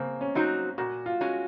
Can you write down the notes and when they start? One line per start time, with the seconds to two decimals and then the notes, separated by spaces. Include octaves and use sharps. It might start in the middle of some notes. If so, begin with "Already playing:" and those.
Already playing: C#3 A#3 C4
0.21 C#4
0.35 F#3 C4 D#4 F#4
0.78 A#2 F#4
1.06 F4
1.21 G#3 C#4 F#4